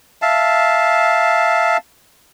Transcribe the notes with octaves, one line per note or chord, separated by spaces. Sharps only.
E5 F5 A5